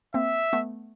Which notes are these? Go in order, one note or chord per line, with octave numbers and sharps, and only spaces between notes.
A#3 C4 E5
A3 B3